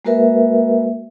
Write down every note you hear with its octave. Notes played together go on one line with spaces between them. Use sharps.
G#3 A#3 F#4 A#4 B4 E5